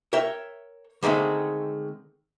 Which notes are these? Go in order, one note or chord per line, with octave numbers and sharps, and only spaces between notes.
A#4 C#5 E5 G5
D3 D#3 G#3 A3 C4